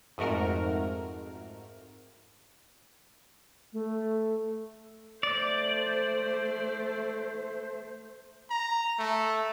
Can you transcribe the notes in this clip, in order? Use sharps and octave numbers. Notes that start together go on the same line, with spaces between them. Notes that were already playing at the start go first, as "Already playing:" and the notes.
F2 G#2 A3 F#4 A#4 F6
A3
A3 C5 D5
A#5
A3